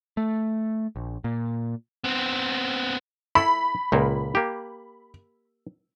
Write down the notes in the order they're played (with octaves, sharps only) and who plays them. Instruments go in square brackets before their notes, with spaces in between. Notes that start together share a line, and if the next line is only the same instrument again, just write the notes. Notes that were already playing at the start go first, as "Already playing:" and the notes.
[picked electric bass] A3
A#1
A#2
[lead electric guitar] B3 C4
[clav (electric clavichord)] E4 A4 [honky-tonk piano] B5
[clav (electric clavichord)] C#2 A#2 A#3
A#3 G4